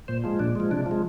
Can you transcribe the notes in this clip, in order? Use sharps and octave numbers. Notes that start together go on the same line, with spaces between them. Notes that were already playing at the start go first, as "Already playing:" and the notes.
A#2 C5
F3 G#3
A#2 D4
F3 G#3
C3 D4
F3
G#3